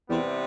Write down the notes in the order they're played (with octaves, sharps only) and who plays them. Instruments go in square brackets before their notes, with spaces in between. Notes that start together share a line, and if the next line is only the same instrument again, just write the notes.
[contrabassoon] E2 [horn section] C3 E3 G3 B3